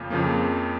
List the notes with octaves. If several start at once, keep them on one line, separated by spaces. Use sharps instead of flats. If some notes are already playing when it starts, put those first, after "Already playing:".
Already playing: F2 C#3 F3 A#3
F2 C#3 F3 A#3